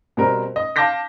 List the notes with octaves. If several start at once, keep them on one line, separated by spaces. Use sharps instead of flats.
B2 G3 C4 A#4
D#5
F5 A5 D6 G6 A#6 B6